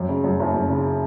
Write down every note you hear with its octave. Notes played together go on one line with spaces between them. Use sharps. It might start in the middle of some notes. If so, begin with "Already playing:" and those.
Already playing: F#2
C#3
F#2
F#1
F#2
C#3